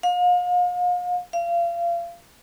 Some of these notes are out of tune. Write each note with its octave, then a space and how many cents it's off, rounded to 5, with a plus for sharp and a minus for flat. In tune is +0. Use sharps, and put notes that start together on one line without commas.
F5 +40
F5 -30